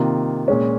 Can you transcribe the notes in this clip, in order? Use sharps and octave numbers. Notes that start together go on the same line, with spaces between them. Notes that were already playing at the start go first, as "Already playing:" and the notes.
Already playing: C3 D#3 A#3 F4
A#2 G#3 C#4